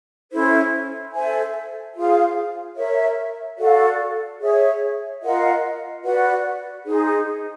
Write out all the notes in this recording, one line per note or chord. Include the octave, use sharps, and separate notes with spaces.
C#4 E4 A4 C5
A4 C5 E5 G#5
F4 G#4 C5 F5
A#4 C#5 E5
F#4 A4 D5 F5
G#4 C#5 E5
F4 A#4 D#5 F#5
F#4 B4 D5 F#5
D#4 G#4 C5